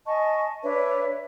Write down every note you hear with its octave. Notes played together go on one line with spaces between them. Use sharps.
D#5 G#5 A5 C#6
D4 B4 C#5 E5